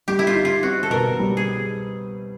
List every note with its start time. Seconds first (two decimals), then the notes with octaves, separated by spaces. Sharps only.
0.08 G3 G4
0.19 E4
0.27 F4
0.35 D#4
0.45 F4
0.63 C4 F#4
0.83 A4
0.90 B2 A#4
1.19 G3
1.37 G#4